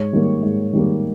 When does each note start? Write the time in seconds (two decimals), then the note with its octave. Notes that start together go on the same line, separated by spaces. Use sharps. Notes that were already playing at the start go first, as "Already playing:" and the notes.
Already playing: G#2 C#5
0.13 D#3 G3 A#3
0.43 G#2
0.73 D#3 G3 A#3